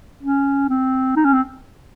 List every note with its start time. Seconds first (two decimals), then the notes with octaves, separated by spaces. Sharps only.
0.23 C#4
0.70 C4
1.16 D#4
1.25 C#4
1.33 C4